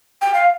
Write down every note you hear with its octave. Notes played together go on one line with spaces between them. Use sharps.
G5
F5